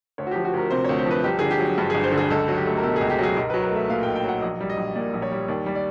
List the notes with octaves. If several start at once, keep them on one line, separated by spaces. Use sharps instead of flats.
D2 C#5
F#4
F3 G4
F#4
D2 A#4
C3 C5
D2 C#5
C5
F3 B4
G1 G4
D3 G#4
G4
F#3
G2
G1 G#4
C5
D3
G#4
C#2 A4
F#3
G4
A3
A#4
B2 A4
G#4
C#2
G4
F#3 G#4
B1 A#4
F#3 B4
A#4
A3 E5
A#2 F5
B1 G5
G5
F#3 F#5
A#1 D#5
G3
D#5
A#1
A#2 D5
A#1
C#5
G3
D#2 D5
G3
D5